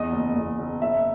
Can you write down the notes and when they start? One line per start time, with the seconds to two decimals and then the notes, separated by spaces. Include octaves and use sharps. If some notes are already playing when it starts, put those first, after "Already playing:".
Already playing: E2 D#5
0.13 F#1
0.36 E2
0.59 F#1
0.82 F#1 E5